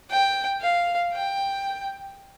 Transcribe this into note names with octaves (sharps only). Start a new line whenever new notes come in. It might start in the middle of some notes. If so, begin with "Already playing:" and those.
G5
F5
G5